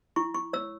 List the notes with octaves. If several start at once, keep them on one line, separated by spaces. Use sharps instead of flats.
E4 C#6
C#6
C#5 E6